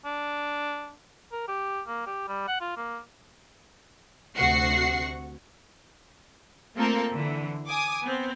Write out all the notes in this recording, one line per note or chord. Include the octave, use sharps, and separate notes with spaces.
D4
A#4
G4
A#3
G4
G3
F#5
F4
A#3
D2 C3 F#4 F#5 C#6 C7
A3 A#3 C4 F4 A4 A#4
D3 E3
G#5 D6 D#6
B3 C4